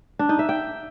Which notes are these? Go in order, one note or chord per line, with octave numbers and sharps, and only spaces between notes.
D4
D#4
E5
G5